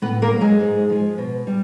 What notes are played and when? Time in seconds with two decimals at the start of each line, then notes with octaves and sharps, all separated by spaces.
0.02 A2 B3 B4
0.22 A#3 A#4
0.31 F#3
0.41 G#3 G#4
0.61 G#2
0.90 F3 G#3
1.18 B2
1.47 G3